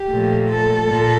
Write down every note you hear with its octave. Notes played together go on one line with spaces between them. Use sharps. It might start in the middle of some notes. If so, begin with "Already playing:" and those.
Already playing: G4
A#2 F3 A3
A4
A#2